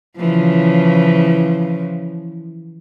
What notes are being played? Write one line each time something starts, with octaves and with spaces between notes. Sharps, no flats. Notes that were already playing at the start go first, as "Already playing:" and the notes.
C#3 E3 F3